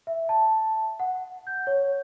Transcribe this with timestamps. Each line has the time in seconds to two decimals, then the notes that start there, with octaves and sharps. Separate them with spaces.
0.07 E5
0.29 A5
1.00 F#5
1.47 G6
1.67 C#5